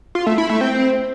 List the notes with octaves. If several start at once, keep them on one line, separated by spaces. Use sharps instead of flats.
F4
A3
E4
A3
C4